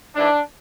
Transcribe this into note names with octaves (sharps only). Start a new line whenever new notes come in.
G#2 E3 D4